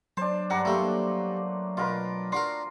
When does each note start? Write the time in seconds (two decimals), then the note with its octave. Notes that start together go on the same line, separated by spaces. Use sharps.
0.17 F#3 D4 C5 A5
0.50 G2 D4 F#5 A#5
0.65 G3 A3 A#3 C4
1.77 B2 F4 A#4 B4
2.32 D4 F#4 A#4 C6